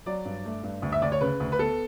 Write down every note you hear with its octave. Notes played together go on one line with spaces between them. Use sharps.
F#3 D5
G2
A3
G2
D2
E5
D2 D5
C#5
C#3 B4
D2
B4
B3 A4